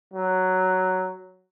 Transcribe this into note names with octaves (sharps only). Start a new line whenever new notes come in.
F#3